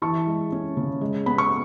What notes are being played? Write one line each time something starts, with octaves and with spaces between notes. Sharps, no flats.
E3 A5 C#6
G#3
C#4
C#3
G#3
B3 B5
C#6